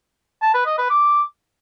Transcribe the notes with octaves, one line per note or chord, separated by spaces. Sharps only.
A5
B4
D#5
B4
D6